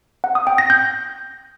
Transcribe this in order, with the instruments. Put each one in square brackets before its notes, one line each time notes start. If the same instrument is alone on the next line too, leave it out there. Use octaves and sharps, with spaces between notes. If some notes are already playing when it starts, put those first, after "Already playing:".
[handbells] F#5
D#6
G5
A#6
G6